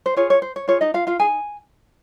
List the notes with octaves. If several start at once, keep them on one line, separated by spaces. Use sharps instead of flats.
C5
F4 G#4 C#5
C#5
C5
C#5
F4 G#4 C#5
D#4 D#5
F4 F5
F4 F5
D#4 G#4 G#5